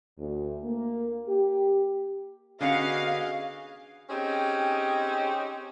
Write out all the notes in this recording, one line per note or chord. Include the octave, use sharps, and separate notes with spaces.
D2
A#3
G4
D3 B3 C#4 F#4 G#4 D#5 F5
C4 C#4 D#4 G4 G#4